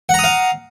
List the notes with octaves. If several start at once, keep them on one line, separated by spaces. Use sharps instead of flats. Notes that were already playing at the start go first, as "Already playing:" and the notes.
F5 F#5 A#5 D#6